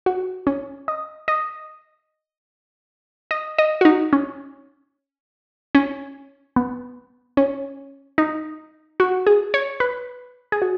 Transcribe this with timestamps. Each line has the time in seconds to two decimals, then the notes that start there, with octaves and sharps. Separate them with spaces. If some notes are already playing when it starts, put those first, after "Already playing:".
0.06 F#4
0.47 C#4
0.88 D#5
1.28 D#5
3.31 D#5
3.58 D#5
3.81 F#4
3.85 D#4
4.13 C#4
5.75 C#4
6.56 B3
7.37 C#4
8.18 D#4
9.00 F#4
9.27 G#4
9.54 C#5
9.80 B4
10.52 G#4
10.62 F#4